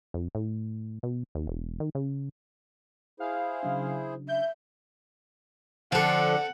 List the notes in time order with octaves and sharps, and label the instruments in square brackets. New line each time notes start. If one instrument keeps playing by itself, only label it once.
[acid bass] F2
A2
B2
D#2
E1
D#3
C#3
[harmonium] E4 G#4 C5 [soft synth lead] F5
[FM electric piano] C#3 F#3 D4
[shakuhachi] E5 [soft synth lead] G6
[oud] D3 F3 [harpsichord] C4 A4 [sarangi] F#5